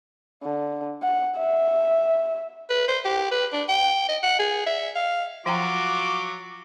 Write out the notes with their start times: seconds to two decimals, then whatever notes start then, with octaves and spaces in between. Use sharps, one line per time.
0.43 D3
1.03 F#5
1.38 E5
2.70 B4
2.88 C5
3.05 G4
3.31 B4
3.53 D4
3.69 G5
4.09 D#5
4.23 F#5
4.39 G#4
4.66 E5
4.96 F5
5.46 F3 F#3 F4 F#4 G5 A#5 D6